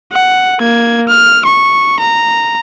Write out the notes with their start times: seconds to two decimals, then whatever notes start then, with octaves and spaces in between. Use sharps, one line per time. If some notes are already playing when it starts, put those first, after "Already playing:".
0.12 F#5
0.60 A#3 G#6
1.08 F6
1.45 C#6
1.99 A#5